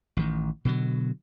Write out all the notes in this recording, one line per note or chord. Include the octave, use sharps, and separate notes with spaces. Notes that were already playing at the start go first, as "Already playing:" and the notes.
A1 D#3
B2 D3 F#3